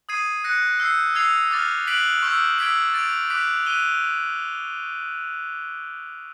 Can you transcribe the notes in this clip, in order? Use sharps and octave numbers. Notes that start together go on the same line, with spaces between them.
D#6 G#6 C7 D#7
F#6 A#6 C#7
E6 G6 C7
E6 G#6 C7 F7
D6 F6 A6
F#6 B6 D7 F#7
C#6 E6 G6
E6 G#6 B6 D7
A6 D7 F7
D6 F#6 B6 D7
F#6 B6 D#7 G7